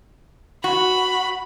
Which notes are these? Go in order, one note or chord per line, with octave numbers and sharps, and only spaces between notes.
F#4 B5